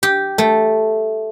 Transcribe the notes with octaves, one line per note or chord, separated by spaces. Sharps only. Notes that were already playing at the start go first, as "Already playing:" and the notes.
G4
A3